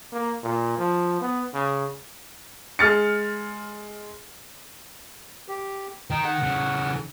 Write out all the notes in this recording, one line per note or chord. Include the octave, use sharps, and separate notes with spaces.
A#3
A#2
F3
B3
C#3
G#3 F6 A6 C#7
G4
D#3 D#4 G5
F#5
C#3 E3